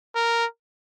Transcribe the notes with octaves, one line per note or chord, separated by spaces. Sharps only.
A#4